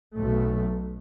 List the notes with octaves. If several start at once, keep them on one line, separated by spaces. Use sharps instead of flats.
B1 B2 A3